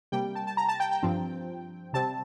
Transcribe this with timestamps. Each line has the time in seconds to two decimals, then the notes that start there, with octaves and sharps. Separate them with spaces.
0.12 C3 G3 A#3 G5
0.35 A5
0.47 A5
0.57 A#5
0.69 A5
0.80 G5
0.91 G5
1.03 G2 F3 C4
1.93 C3 G3 C4 A5